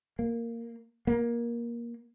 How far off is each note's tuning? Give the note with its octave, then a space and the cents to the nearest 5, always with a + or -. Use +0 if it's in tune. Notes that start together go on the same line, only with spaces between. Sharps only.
A#3 -5
A#3 +15